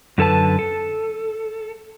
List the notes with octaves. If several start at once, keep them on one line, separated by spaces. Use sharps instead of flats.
F#2 D3 A4 B4 A5
A4